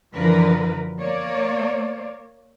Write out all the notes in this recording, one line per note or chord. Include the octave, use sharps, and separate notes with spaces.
F#2 D3 E3 F3 A#4 B4
A#3 C#5 D5